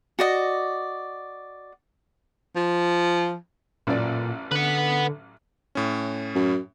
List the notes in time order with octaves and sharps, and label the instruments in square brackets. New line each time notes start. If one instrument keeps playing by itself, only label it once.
[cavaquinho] F#4 D5 D#5
[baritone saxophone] F3
[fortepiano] A1 F#2 D5 [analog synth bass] A#2
[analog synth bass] D3 [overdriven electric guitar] B4 F#5
[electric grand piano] A2 C#4
[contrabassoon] F#2